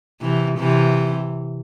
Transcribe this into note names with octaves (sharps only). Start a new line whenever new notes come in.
C3 E3
C3 E3